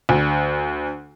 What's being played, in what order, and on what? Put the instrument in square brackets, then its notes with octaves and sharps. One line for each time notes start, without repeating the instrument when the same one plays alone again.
[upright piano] D2